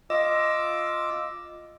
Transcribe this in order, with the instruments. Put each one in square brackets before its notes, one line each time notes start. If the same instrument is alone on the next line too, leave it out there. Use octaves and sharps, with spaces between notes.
[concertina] F4 D6 E6 [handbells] D#5